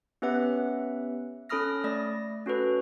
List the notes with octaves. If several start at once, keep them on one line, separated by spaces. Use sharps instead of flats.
B3 C#4 G4 B4 E5 F#5
C#4 A4 B5 D#6 F6 A#6
A3 D5 A#6
C#4 F#4 A4 B4